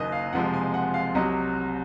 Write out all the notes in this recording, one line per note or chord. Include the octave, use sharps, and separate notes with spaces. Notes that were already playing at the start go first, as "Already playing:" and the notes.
Already playing: F#1 F#2 D#3 F#3 A#3 D#5
F5
F#1 F2 C3 F3 G#3 F#5
G#5
F#5
F5
C2 C3 F#3 D#5